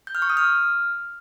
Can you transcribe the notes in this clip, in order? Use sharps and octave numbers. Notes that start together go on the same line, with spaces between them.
G6
F6
C#6
D#6
F6